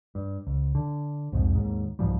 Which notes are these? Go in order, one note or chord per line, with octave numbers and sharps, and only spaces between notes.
G2
C#2
D3
C2 F2 G#2
D#2 G#2
C2 G#2 F3 G3